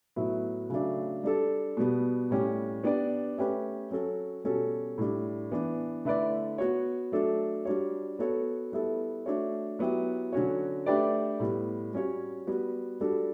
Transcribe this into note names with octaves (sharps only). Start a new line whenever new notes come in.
A2 F#3 B3 E4
C#3 F#3 A3 D4
G3 D4 A4
B2 G3 B3
A2 G3 C#4 G4
B3 D4 G4 B4 D5
A3 C#4 G4 B4
F#3 C#4 F#4 A4
B2 G3 C#4 F#4 A4
A2 G3 D4
E3 B3 D4
D3 A3 E4 B4 D5
B3 F#4 C#5
F#3 A3 D4 A4
G3 D4 F#4 C#5
B3 F#4 A4 C#5
G3 B3 E4 A4
A3 D4 F#4 C#5
F#3 B3 E4 G4
D3 F#3 C#4 F#4 C#5
A3 D4 G4 B4 D5
A2 G3 B3
G3 C#4 F#4 C#5
G3 B3 F#4
G3 D4 F#4 A4